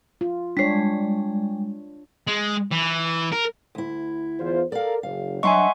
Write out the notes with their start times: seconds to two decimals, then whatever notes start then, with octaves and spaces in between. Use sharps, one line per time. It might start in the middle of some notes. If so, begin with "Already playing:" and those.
0.21 F4
0.57 G3 G#3 D4 C#5
2.27 G#3
2.72 E3
3.32 A#4
3.75 D2 E4
4.40 E2 F4 C5
4.72 A4 A#4 D5 F5
5.03 F#1 F5
5.43 F#3 D4 D#5 E5 F#5 G#5 C6 C#6